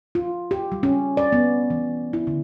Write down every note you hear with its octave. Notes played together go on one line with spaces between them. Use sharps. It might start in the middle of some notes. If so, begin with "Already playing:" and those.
F4
G4
G3
C#4
D5
B3
E3
E4
D3